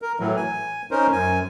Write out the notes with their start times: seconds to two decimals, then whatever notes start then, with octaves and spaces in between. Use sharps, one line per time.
0.02 A#4
0.20 A2 E3 F#3
0.37 G#5
0.91 C#4 D#4 A#4 C5
1.12 F#2 G#5